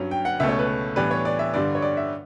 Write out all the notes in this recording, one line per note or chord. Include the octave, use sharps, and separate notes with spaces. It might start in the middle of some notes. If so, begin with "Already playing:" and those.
Already playing: G2 F#3 C#4
G5
F#5
C#2 B2 A3 E5
C#5
B4
A2 E3 G3 B3 D4 B4
C#5
D5
E5
G2 D3 G3 D5
C#5
D5
E5